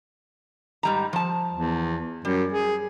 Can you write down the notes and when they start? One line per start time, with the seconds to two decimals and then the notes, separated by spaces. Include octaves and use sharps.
0.83 G#2 G3 A#5
1.13 F3 A5
1.52 E2
2.25 F#2 G3
2.53 G#4